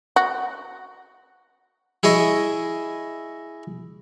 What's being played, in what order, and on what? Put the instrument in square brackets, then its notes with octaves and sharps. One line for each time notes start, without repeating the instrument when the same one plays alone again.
[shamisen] F#4
[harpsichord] E4 G#4 C#5 D#5